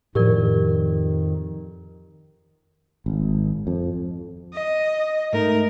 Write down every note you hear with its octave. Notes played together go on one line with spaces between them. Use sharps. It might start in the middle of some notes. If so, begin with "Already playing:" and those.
F2 A2 D#3 F3 G4 A#4 D5
G#1
F2
D#5
G#2 A3 D#4 A#4